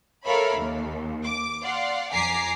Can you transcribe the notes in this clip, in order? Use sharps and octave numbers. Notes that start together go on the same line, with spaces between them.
A4 A#4 C#5 E5 F5 B5
D#2
D6
D5 F5 F#5 C6
F2 G#5 A#5 D6 B6 C7